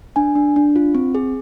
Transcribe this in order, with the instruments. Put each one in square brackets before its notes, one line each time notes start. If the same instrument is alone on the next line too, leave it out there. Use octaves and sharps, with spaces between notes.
[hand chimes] D4 G#5
D4
D4
F4
C4
G#4